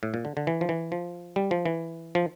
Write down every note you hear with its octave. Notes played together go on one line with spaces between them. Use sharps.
A2
A#2
D3
D3
E3
F3
E3
F3
G3
F3
E3
F3